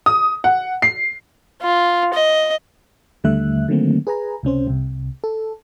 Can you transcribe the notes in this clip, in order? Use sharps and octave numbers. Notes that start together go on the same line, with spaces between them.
D#6
F#5
C7
F4
D#5
D#2 D3 G3 A3 E5 F#6
D3 D#3 F#3 A3 A#3 C4
G#4 B4 G#5 A#5
C#2 C3 C#4 C5
C2 C3
A4